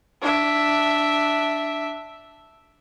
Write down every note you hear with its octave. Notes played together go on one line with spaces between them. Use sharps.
D4 E5